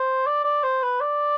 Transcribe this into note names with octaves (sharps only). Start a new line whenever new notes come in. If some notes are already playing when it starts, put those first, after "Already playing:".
Already playing: C5
D5
D5
C5
B4
D5